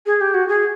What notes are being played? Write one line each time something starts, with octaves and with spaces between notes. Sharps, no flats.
G#4
G4
F#4
G#4